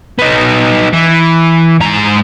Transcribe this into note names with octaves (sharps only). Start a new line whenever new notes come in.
B3 D#4
E3
G#2 A#5